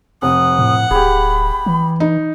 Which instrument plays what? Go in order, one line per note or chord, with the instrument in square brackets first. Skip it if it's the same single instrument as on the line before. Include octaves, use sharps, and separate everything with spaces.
[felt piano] F1 [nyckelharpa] F#5 [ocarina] D#6
[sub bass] A2
[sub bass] D1 [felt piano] G4 G#4 [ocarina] B5
[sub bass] E3
[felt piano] D#4